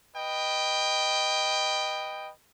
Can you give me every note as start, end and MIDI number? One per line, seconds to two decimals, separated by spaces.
0.16 2.31 71
0.16 2.31 75
0.16 2.31 79